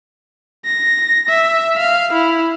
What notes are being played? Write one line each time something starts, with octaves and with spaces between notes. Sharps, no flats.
A#6
E5
F5
E4